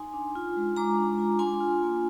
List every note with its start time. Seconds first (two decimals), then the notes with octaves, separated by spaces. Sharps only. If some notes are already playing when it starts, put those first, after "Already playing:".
Already playing: D#4 G#5 C6
0.14 D4
0.35 F4
0.56 G#3
0.77 G#3 A#5 D6
0.97 D4
1.18 F4
1.39 D4 G#5 C6
1.61 F4
1.82 A#3